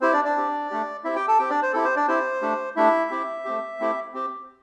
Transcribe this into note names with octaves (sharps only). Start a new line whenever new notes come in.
C4 E4 G4 C5
D4 D5
D4 D5
C4 G4
A3 D4 G4
C4 E4 G4 E5
G4 G5
A4 A5
C4 G4 G5
D4 D5
C5
C4 E4 G4 A4
C5
D4 D5
C4 E4 G4 C5
A3 D4 G4
A3 D4 E4 G4 E5
C4 E4 G4
A3 C4 G4
A3 C4 E4 G4
C4 G4